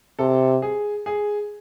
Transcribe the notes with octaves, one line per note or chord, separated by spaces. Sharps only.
C3 A4
G#4
G#4